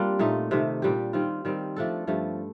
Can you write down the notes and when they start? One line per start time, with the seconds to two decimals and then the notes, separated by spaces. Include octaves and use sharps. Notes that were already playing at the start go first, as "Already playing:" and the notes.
Already playing: G3 A#3 C4 D4 F4
0.19 A#2 A3 D#4
0.51 C3 D#3 A3
0.82 A#2 G3 D4 G4
1.13 D#3 G3 C4 F4
1.45 D#3 G3 C4
1.76 F3 A3 D4 A4
2.07 G2 F3 A3